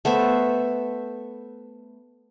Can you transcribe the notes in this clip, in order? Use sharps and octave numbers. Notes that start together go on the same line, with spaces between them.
A3 B3 C5 E5